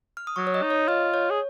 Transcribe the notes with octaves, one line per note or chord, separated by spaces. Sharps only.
F6
D#6
F#3 C#6
C#5
D#5
D#4
C#5
F4 D#5
C#5
G#4